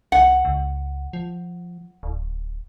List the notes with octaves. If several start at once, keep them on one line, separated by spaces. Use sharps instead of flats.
C2 F#5
C#2
F3
D1